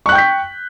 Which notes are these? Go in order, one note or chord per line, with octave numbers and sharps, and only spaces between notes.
G5 C#6 F#6 G6 B6